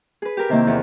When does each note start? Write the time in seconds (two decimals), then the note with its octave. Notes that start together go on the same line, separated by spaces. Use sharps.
0.22 G#4 B4
0.37 G4 A#4
0.49 C3 D#3 A#3 E4
0.67 E2